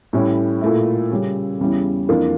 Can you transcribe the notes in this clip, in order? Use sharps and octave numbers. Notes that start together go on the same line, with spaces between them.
A2 G3 C#4 E4
A#2 A3 E4
C#3 G3 C#4
E2 C#3 G3 C#4 E4
F2 E3 A#3 D4 F4